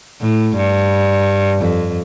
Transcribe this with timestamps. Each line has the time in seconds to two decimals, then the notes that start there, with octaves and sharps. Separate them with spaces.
0.21 A2
0.56 G2
1.61 F2